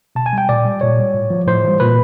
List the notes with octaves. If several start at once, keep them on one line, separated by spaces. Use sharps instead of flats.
B2 A5
G#5
G3 G5
A#2 D5
G3
A#2 C#5
G3
A2
F3
A2 C5
E3 G3
A#2 B4